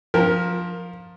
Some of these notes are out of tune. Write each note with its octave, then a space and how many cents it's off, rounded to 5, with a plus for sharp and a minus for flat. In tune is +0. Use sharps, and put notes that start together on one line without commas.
F3 +15 A#4 +0